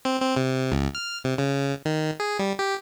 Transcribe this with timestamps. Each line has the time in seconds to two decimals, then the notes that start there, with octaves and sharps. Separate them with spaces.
0.05 C4
0.21 C4
0.36 C3
0.72 C#2
0.95 F6
1.24 C3
1.38 C#3
1.85 D#3
2.20 G#4
2.39 G3
2.59 G4